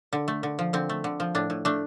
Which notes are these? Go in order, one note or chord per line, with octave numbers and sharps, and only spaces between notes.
D3
A3
D3
F3
D3 C4
A3
D3
F3
A2 D4
A2
A3 D4